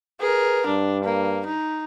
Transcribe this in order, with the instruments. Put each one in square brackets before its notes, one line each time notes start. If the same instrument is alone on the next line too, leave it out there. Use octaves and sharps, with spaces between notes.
[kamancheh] G#4 A#4 [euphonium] B4
[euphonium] G2 [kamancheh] D4
[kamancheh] A#3
D#4